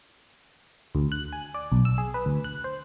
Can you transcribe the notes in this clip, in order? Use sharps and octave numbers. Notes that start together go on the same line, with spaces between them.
D2
F#6
G#5
D5
B1
E6
G#4
B4
D2
F#6
C5